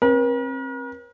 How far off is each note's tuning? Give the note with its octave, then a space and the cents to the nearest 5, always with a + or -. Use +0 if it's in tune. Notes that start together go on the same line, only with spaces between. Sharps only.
C4 +35 A#4 +45